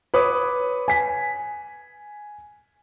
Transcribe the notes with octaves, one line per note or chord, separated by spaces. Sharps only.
B4 C#5 D6 D#6
G#5 B6